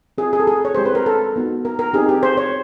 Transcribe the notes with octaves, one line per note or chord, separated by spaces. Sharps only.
C4 F4 G#4
G#4
A4
G#4
C#5
G#3 C4 E4 G4 C5
B4
A#4
A4
B3 D#4 F#4
A#4
A#4
C4 D#4 G4 G#4
G4
C5
C#5